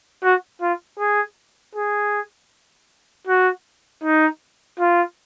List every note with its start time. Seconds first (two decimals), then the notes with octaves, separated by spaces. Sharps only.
0.23 F#4
0.61 F4
0.99 G#4
1.75 G#4
3.27 F#4
4.04 D#4
4.80 F4